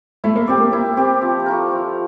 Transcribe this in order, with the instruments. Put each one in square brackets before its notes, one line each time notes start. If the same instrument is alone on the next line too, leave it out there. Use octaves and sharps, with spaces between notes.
[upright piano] A3 [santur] E4
[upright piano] A#3
[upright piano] C4 [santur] G4 D5
[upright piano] A#3
[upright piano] A#3 [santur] E4
[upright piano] C4 [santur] G4 D5
[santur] F3
A3 E4 A#4
F3